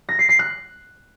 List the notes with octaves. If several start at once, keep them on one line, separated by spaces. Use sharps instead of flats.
A#6
C7
C7
F#6